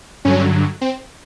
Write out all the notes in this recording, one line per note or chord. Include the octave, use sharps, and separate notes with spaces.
G2 D3 F#3 C#4
C4